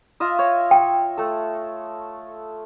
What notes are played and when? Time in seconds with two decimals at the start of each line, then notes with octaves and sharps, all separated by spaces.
0.20 F4 D#5 E5
0.39 C#5
0.71 G5
1.17 A3 A4